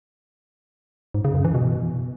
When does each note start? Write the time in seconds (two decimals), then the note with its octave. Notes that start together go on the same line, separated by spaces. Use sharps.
1.14 G#2
1.24 C#3
1.35 F#2
1.45 E3
1.55 B2